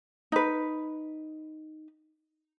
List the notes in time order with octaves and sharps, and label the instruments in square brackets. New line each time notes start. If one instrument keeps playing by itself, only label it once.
[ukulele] D#4 B4